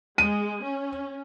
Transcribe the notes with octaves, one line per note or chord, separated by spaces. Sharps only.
G#3 D#7
C#4